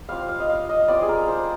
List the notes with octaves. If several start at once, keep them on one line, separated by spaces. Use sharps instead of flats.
G3 C4 F4 F5
F5
D#5
F5
D#5
G3 C4 F4 D5
G#4
A#4
C5